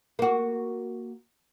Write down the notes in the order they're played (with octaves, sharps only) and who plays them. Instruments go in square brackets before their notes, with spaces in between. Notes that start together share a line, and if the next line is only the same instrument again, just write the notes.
[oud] A#3 F#4